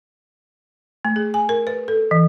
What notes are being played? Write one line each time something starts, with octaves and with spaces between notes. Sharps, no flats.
A3
G#4
G#5
A#4
B4
A4
E3